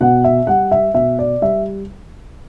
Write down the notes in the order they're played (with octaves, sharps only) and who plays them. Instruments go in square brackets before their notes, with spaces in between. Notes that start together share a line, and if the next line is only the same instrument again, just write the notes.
[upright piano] B2 F#5
E5
G3 F#5
E5
B2 E5
D5
G3 E5